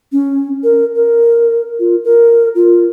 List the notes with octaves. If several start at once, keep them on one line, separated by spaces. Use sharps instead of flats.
C#4
A#4
A#4
F4
A#4
F4